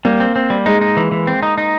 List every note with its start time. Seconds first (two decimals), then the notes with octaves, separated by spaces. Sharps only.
0.05 G3 A#3
0.20 C4
0.36 C4
0.50 G3
0.66 G#3 D#4
0.81 D#4
0.97 E3
1.12 E3
1.27 C4
1.43 D#4
1.58 D#4